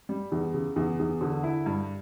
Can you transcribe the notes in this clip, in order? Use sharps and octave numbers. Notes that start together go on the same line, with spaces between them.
G3
E2
C#3
E2
E2
D3
E4
G2